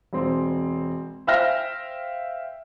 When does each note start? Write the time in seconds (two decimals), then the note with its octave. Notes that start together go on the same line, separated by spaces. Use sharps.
0.13 E1 C4
1.27 C5 E5 F5 G5 F6 A#6